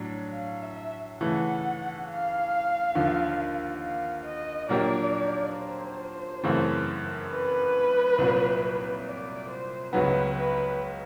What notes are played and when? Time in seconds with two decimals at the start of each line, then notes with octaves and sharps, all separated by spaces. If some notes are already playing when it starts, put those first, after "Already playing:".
Already playing: A2 F#3 D4
0.33 F5
0.62 E5
1.21 C#3 E3 A3 F#5
2.07 F5
2.95 D#2 D3 F3
3.82 F5
4.25 D#5
4.69 A#2 F#3 A#3 D4 G4 D5
5.57 C5
6.44 F#2 C#3 E3 A3 C4
7.31 B4
8.18 C2 A#2 F#3
9.06 D5
9.49 C5
9.93 C#2 C#3 F#3 B3 B4
10.36 B4